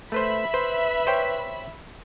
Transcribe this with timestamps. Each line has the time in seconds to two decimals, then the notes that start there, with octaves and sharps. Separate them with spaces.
0.12 A3 B4 C5 E5 B5
0.54 B4 C5
1.07 C5 C#5 G5